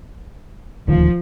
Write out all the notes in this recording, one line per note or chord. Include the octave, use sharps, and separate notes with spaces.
D#1 D2 D#3 F3